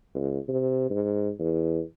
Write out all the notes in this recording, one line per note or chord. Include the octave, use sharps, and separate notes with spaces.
C#2
C3
G#2
E2